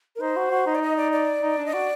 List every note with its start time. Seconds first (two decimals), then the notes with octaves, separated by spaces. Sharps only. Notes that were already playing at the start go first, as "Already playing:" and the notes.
0.16 A#4
0.21 D#4 C5
0.37 F#4
0.51 F#4
0.67 D#4
0.75 D5
0.82 D#5
0.97 D5
1.12 D5
1.42 D#4
1.58 D4
1.66 D#5
1.73 F#4 D5